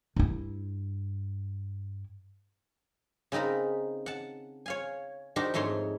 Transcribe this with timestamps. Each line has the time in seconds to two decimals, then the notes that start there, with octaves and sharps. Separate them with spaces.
0.16 G2 E4
3.32 C#3 C4 D#4 A#4 B5
4.06 F#5 A5
4.66 C#5 F5 G#5
5.36 D4 D#4 F#4 G4 A#4 C5
5.54 F2 G#2 A3 C#5 C6